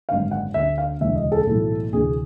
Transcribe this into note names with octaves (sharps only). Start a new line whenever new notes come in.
G#1 F#2 D3 F5
F#5
D2 D3 E5
F5
E1 D2 C#3 E3 E5
D#5
A4
B1 A2 E3
D2 C3 E3 G#4